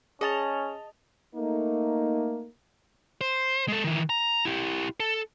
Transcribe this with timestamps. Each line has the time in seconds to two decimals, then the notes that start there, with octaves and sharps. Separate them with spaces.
0.21 C#4 G#4 D#5 A5 F7
1.35 A3 A#3 D#4
3.21 C5
3.68 G#3 A4
3.84 D#3 E3
4.10 A#5
4.45 E4 G4
5.00 A4